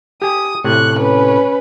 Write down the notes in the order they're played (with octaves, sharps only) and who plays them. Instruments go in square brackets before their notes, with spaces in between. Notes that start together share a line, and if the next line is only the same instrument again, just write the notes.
[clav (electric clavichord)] G4 G#5 [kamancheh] D#6
[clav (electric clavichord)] A2 C3 [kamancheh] C#6 F#6
[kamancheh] C#4 B4